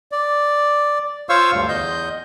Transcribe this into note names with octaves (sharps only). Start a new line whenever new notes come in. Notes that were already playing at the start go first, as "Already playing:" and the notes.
D5
F4 C5 C#5 F5 C#6 E6
D2 G2
E2 D#5 G6